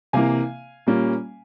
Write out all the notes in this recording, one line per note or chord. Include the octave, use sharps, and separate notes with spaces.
C3 E3 A#3 F5 G#5
A#2 G3 A#3 C#4